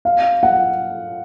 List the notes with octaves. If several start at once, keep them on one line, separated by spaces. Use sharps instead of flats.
F5
F#5